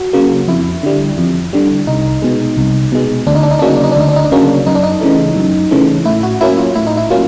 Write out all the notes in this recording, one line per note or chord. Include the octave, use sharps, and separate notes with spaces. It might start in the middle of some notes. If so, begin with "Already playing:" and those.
Already playing: F#4
C#3 F#3 A#3
F2 E4
D3 G3
F2
D3 G3
C2 D#4
B2 G#3
C2
B2 G#3
D2 D4
D#4
D4
D#4
C#3 F#3 A#3 C#4 D4
D#4
D4
D#4
D4
D2 D#4
D4
D#4
D4
C#3 F#3 A#3 C#4
F#2 D#4
D4
D#4
C#3 E3 A3
F#2
C#3 E3 A3
A2 E4
F#4
F#3 A#3 C#4 E4
F4
A2 E4
D#4
E4
F#3 A#3 C#4 F4